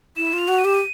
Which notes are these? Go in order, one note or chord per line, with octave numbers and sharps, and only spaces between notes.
E4 E7
F4
F7
F#4
D#7
G4 E7
D#7